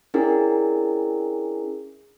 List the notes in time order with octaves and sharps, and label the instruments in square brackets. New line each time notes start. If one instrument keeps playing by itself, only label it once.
[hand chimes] C#4 D4 E4 G#4 A#4